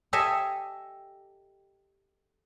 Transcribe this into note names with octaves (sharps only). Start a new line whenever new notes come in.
G4 A4 D#5 E5 G#5